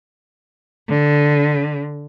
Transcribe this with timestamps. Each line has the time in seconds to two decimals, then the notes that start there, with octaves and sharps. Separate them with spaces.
0.88 D3